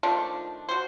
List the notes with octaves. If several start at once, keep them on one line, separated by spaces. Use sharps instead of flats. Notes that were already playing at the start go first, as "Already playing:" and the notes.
D#3 F3 A3 D4
F#4 C5